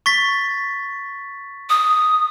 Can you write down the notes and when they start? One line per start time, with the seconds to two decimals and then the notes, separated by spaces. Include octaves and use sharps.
0.06 C#6 A6 B6
1.70 D#6